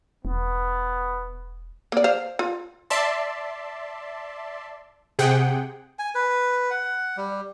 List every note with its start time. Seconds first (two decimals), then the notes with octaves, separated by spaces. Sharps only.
0.25 E1 B3
1.92 A#3 D5
2.04 C5 F5
2.39 F4
2.90 D5 E5 A5 C6
5.19 C3 G#4 F#5 G5
5.99 G#5
6.15 B4
6.71 F#5
7.17 G3